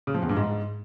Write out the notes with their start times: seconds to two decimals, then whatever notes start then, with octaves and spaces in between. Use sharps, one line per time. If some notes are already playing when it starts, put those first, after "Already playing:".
0.07 C#3
0.14 F3
0.22 E2
0.29 G2
0.37 G#2